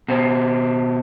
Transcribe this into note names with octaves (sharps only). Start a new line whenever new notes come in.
B2 C4